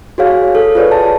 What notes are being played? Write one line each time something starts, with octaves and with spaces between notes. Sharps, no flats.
F#4 G#4 C#5 F5
A4
F4 G#4 B4 C#5 D5
A5